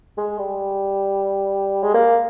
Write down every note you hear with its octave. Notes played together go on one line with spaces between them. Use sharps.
G#3
G3
G#3
A#3